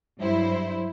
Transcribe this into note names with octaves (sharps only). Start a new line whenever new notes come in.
G2 F#3 E4 C5